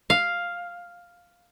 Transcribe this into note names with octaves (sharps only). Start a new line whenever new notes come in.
F5